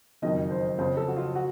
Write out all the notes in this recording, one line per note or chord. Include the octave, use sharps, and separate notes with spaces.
F#1 F2 D#3 F#3 D#5
C5
F2 C#3 F3 C5
A4
F#4
F4
F#4